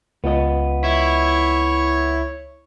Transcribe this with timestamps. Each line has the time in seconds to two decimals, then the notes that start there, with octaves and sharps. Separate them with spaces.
0.24 C#2 B3 F4 D#5
0.84 E4 C#5